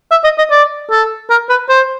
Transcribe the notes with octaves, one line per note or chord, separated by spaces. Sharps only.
E5
D#5
D#5
D5
A4
A#4
B4
C5